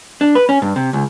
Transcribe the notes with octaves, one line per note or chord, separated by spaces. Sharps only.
D4
B4
C#4
G2
C3
C#2